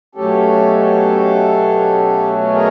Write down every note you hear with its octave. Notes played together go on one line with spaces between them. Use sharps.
B2 F#3 A3 C#4 G4 A4
G#4 A#4